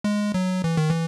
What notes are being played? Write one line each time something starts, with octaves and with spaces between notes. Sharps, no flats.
G#3
F#3
E3
D#3
E3